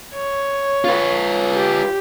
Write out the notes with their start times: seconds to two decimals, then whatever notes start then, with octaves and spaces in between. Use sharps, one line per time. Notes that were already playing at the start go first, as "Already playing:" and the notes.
0.14 C#5
0.85 F4 B4
1.54 G4